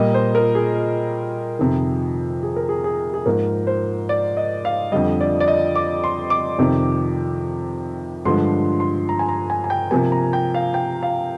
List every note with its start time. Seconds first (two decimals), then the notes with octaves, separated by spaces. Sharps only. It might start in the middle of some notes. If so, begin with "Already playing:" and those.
Already playing: A#2 G3 A#3 D#5
0.14 C5
0.35 A#4
0.55 G#4
1.59 F2 C3 D#3
2.43 G#4
2.56 A#4
2.69 G#4
2.84 G#4
3.14 G#4
3.26 G#2 F3 A#3 A#4
3.67 C5
4.09 D5
4.37 D#5
4.65 F5
4.92 F2 D3 G3 D#5
5.21 D5
5.40 D5
5.48 D#5
5.75 D6
6.04 C6
6.30 D6
6.58 F2 C3 D#3
8.25 G2 D3 F3 G#3 C6
8.80 C6
9.09 A#5
9.19 G#5
9.29 A#5
9.50 G#5
9.64 G#5
9.70 G5
9.91 C3 F3 A#3 G#5
10.12 A#5
10.33 G5
10.54 F5
10.74 G5
11.03 F5